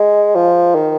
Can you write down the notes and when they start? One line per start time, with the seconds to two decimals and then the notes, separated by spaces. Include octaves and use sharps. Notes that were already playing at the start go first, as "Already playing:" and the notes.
Already playing: G#3
0.35 F3
0.75 D#3